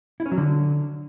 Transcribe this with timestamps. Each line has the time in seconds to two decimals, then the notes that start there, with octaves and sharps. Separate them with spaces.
0.20 E4
0.26 C#4
0.32 F#3
0.37 D3